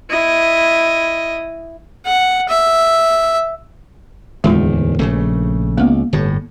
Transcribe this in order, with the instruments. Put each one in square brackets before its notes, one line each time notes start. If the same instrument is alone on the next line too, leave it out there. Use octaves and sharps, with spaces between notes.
[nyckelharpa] E4 D#5
F#5
E5
[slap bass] D1 E2 D#3 [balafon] G#3 F4
[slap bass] A#1 C#3 A3
[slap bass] C#2 [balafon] A#3 B3
[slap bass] G1 A2